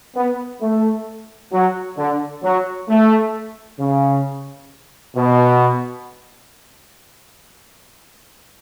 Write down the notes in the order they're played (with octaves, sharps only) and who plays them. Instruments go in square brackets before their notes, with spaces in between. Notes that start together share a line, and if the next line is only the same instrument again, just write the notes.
[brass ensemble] B3
A3
F#3
D3
F#3
A3
C#3
B2